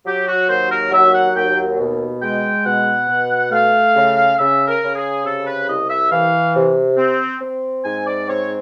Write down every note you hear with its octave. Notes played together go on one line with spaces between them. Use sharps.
F#3 G4
F#4
D#2 C5
A#4
F#3 E5
F#5
D#2 G5
B2
G#3 G5
B2 F#5
B2
A3 F5
C#3
C#3 E5
A#4
C#3
G#4
C3 A4
B4
C2 D#5
E5
E3 F5
C3
C4
C4
G#2 G#5
D5
C4 C#5